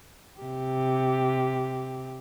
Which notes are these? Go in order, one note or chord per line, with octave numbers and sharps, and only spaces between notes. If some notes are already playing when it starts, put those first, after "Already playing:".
C3 G4